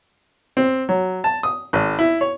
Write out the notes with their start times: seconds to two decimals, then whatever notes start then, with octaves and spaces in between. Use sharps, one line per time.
0.57 C4
0.89 F#3
1.24 A5
1.43 D#6
1.73 G#1
1.99 E4
2.21 C#5